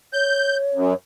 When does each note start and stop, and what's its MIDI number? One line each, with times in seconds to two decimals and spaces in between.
0.13 0.95 73
0.13 0.57 91
0.74 0.94 42